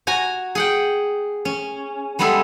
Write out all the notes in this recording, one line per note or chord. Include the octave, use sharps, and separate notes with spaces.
F#4 G#5 A#5
G#4 F#5 G5
C#4
G3 G#3 B3 G#4 A4 E5